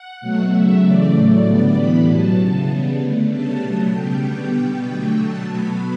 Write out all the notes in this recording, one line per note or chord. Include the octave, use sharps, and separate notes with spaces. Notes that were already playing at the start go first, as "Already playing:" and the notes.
Already playing: F#5
B2 F#3 A3
C#3 F#3 A3 E5
C#3 E3 A3 D5
A2 F#3 A3
D3 G3 B3 D5
A2 E3 G3 B3 B5
B2 F#3 B3 A5
C#3 E3 B3
C#3 G3 B3
D3 A3
C#3 G3 B3 A5
B2 F#3 A3
C#3 G3 B3 G5
D3 G3 B3 G5
B2 G3 B3 G5
D3 F#3 A3
B2 F#3 A3 A5
B2 F#3 B3 B5